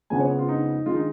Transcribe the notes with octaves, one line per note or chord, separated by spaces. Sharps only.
F2 C#3 G#3 B3 G#5
C#5
F4
D#4
D#3 G#3 F4
D#4